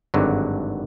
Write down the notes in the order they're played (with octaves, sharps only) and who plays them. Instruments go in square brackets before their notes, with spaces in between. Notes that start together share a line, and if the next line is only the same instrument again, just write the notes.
[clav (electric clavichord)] G#1 G2 D3 F#3